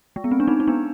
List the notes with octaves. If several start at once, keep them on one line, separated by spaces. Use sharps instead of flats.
G#3
B3
C4
D4
C4 D#4
D#4
B3 D4